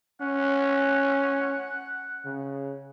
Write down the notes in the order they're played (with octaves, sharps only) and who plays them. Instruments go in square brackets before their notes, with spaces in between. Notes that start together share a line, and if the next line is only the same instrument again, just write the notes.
[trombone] C#4 [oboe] F#5
[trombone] C#3